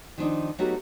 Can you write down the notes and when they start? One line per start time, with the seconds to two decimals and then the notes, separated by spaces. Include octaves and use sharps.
0.18 D#3 F3 D4 D#4
0.59 F#3 A3 B3 D#4 F#4 G4